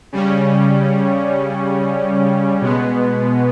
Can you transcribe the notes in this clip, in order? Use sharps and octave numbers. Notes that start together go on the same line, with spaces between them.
C#3 G3 C#4
B2 G#3 B3